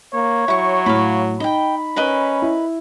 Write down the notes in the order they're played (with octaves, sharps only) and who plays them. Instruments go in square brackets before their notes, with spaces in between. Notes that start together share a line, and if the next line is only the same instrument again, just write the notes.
[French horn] A#3 [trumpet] C#5
[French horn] F#3 [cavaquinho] E4 C#6
[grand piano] A2 [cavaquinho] F5 B5
[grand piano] D#4 [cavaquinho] D#5 G5 [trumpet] B5
[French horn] C#4 [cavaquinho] A#4 B4 D#5
[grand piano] E4